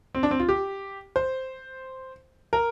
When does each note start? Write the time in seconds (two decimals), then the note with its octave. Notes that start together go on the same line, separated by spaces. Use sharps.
0.15 C4
0.23 D4
0.31 C4
0.40 F4
0.49 G4
1.16 C5
2.53 A#4